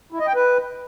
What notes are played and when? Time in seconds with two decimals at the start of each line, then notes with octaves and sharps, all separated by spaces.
0.12 E4
0.20 D#5
0.27 G5
0.35 B4